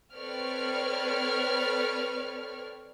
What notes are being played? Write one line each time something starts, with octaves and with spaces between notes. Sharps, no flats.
C4 A4 B4 C#5 D5 F6